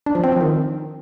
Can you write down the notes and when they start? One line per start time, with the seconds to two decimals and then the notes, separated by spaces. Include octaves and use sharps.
0.06 D4
0.15 F3
0.24 C4
0.32 F3
0.41 D#3